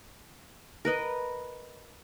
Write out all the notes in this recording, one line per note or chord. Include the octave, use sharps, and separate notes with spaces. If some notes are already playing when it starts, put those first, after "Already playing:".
A#4 B4 D#5